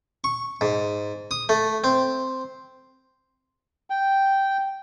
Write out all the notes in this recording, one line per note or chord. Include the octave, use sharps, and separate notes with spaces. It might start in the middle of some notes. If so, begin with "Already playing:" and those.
C#6
G#2
D#6
A3
C4
G5